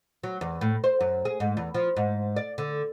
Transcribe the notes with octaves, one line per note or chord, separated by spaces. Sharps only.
F#3
E2
A2
C5
F#2
G#4
G#2
E2
F3
G#2
D5
D3